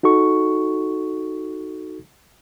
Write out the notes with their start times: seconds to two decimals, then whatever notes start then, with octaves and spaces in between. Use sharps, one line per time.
0.03 D#4 F#4 A4 C#6